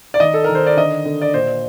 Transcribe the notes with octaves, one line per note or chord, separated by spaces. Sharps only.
D5
D#3 D#5
A4
D#3 A#4
C5
D5
D3 D#5
D3
D5
A#2 C5